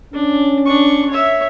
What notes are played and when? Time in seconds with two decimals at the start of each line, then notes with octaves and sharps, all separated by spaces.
0.14 C#4 D4
0.67 D4 C#6
1.10 C#5 E5